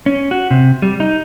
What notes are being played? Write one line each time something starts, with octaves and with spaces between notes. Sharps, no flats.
C#4
F#4
C3
G3
D#4